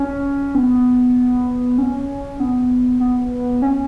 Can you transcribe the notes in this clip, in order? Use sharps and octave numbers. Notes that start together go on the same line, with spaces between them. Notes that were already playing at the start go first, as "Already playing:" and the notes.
Already playing: C#4
B3
C#4
B3
B3
C#4